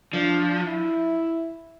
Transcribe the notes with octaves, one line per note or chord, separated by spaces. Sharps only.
F3 D4
E4